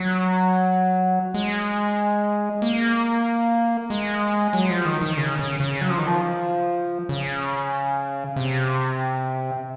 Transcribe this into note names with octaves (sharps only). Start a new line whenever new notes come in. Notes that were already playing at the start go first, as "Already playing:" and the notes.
Already playing: F#3
G#3
A#3
G#3
F#3
F3
D#3
D#3
C#3
C#3
C#3
F#3
F3
D#3
F3
C#3
C3